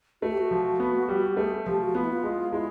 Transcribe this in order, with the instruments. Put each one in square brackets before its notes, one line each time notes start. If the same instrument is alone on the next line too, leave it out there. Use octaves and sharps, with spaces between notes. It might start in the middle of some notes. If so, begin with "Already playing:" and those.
[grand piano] A3 [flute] F#4
[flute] G4
F#4
[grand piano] F3
B3
G3
[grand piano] A3 [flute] G#4
[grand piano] F3 [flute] G4
[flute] F#4
[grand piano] B3 [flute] F4
[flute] E4
F4
[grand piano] G#3
[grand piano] G#3 [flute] E4